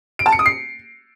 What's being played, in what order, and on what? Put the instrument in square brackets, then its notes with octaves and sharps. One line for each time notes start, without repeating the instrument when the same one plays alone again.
[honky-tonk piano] D7
A5
C#7
D#6
C7